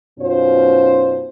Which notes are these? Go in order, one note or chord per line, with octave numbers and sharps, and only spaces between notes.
F#2 B2 C#4 D#4 F4 C5